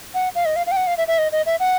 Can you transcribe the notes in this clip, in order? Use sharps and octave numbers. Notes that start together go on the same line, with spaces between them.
F#5
F5
D#5
F5
F5
G5
F#5
F5
E5
E5
D#5
D#5
E5
F#5